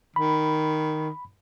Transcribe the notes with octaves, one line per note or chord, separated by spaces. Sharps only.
D#3 B5